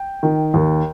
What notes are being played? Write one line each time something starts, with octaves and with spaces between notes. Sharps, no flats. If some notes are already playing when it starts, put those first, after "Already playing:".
Already playing: G5
D#3
D#2